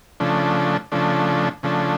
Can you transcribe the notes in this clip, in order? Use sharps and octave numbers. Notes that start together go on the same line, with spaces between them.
C#3 F3 A3 D4
C#3 F3 A3 D4
C#3 F3 A3 D4